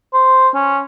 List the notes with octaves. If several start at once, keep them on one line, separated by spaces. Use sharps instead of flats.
C5
C#4